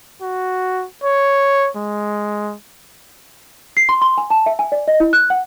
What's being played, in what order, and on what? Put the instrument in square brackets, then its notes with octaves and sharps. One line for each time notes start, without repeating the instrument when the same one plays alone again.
[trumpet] F#4
C#5
G#3
[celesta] C7
C6
C6
G#5
A5
E5
G#5
D5
D#5
E4
F#6
F#5